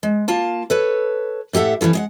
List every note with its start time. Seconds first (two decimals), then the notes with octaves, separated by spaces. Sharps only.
0.03 G#3
0.28 A#3 F4 A5
0.70 A4 B4 C#5
1.53 A2 G4 A4 E5 F#5
1.81 F2 E3 G3 F4 A4
1.93 G#3 D#5 F#5